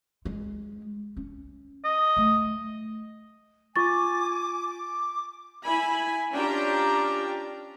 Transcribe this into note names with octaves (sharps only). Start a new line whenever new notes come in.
G#3
C#4
D#5
A3
F4 G#5 C#6 D6 A6
D6
E4 G#5 B5
C#4 D4 F4 G4 G5 A#5